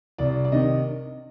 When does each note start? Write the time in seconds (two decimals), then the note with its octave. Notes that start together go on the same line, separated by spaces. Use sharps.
0.18 C2 D5
0.45 D5
0.52 C3 D#3 D#5